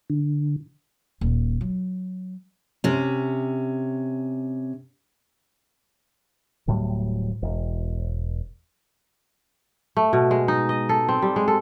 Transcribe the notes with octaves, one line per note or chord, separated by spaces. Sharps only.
D3
D#1
F#3
C3 C#4
D1 A2 F#3 G3
E1
A3
B2
G#3
D#4
D#5
A4
C4
G3
G#3
A4